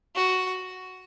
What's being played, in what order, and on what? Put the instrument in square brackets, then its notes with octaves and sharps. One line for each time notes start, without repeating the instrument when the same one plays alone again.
[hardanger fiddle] F#4